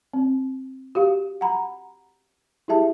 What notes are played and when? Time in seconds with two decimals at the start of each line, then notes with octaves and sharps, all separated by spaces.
0.14 C4
0.95 F#4 G4 F5
1.41 F#5 A#5 B5
2.68 E4 G4 G#4 E5 A5